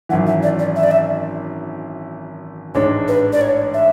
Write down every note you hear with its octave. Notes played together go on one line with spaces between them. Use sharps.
G#1 F#2 E3 F#5
E5
D5
D5
E5
D5
E5
A1 G#2 G#3 D4 C#5
B4
D5
C#5
E5